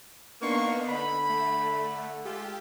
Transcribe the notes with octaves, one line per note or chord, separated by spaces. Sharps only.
A#3 B3 D4 D#4 C6 C#6
D3 B5
A3
G#3 F4 G4 A4